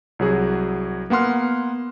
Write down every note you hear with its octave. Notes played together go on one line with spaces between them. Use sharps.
C2 F#3 G#4
A#3 B3 F#5 C6 F6